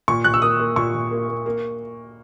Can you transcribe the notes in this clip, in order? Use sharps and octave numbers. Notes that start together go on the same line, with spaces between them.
A#2 C#6
A#2 F#6
E6
A#3 D#6
A#3
A#2 C#6
A#2
A#3
A#3
A#3